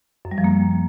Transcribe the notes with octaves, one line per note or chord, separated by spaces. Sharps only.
F#2
G3
F3
A#3